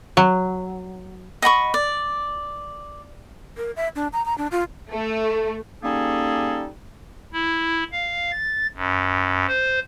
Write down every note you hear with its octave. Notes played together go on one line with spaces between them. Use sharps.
F#3
D#5 F#5 B5 C#6
D5
A#4
E5
D4
A#5
A#5
D4
F4
A3
G3 A#3 C#4 D#4 G#4 A4
E4
F5
A6
F#2
C5